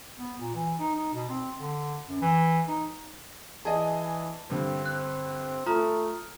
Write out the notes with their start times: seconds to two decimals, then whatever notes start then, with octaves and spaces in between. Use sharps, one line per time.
0.18 B3
0.40 A#2
0.54 E3
0.79 D#4
0.95 D#4
1.14 B2
1.29 C4
1.57 D3
2.09 F#2
2.21 E3
2.68 D#4
3.65 E3 G#4 D5 D#5 A5
4.50 G2 D3 C4
4.86 C4 F#6
5.66 A3 F4 A#5 D#6 F6